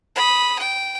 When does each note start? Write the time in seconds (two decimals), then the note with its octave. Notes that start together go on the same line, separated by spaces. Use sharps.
0.15 B5 D#6
0.59 G5